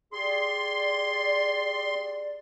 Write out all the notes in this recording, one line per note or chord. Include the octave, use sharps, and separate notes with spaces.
G4 G#4 D5 C6